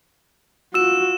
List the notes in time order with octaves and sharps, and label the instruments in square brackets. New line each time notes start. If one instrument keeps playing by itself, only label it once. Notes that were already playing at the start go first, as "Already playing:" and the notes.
[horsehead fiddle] F4 F#4 [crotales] E6 E7